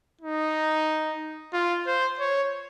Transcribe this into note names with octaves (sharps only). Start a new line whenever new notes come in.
D#4
F4
C5
C#5